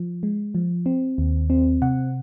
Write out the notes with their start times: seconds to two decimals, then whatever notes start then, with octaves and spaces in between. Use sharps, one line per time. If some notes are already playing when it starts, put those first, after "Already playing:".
Already playing: F3
0.23 G#3
0.55 F3
0.86 C4
1.18 D#2
1.50 C4
1.82 C3 F#5